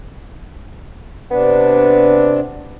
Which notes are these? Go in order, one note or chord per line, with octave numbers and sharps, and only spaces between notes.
C3 B3 D4